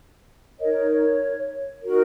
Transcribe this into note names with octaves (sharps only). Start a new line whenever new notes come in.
D#4 A#4 C#5 D#5
C#5
D#4 F#4 A#4